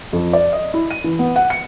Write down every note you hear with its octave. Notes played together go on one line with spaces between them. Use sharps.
F2
D5
D#5
E4
D#7
E3
B3
F#5
C#7